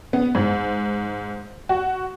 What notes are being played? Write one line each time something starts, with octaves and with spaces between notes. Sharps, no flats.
B3
G#2
F#4